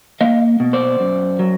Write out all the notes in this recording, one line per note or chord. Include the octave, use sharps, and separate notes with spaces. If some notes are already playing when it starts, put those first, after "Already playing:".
A#3 D#5 F5
B2
C5 D5
F#2
F#3